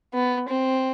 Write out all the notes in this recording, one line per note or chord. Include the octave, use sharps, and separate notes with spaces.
B3
C4